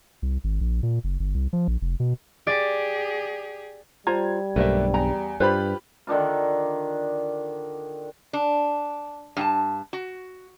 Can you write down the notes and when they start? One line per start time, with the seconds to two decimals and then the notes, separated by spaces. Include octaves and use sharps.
0.22 C2
0.44 G#1
0.61 A#1
0.83 A#2
1.04 F#1
1.20 G1
1.34 C2
1.53 F3
1.68 A#1
1.81 F1
2.00 B2
2.47 G4 G#4 D5
4.07 G3 F4 C5 A#5 G#6
4.56 B1 G2 A3 A#3 D4 B4 C5 E5
4.94 E2 A#5
5.40 G2 F4 G4 B4 C5 D5 B5
6.07 D3 D#3 D4 F4
8.33 D4
9.37 G2 F#4 A5
9.93 F#4